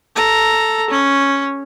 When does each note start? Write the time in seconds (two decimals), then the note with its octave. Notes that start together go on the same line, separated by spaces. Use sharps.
0.15 A4 A#5
0.90 C#4